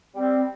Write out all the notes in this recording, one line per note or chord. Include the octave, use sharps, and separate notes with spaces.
G3 C4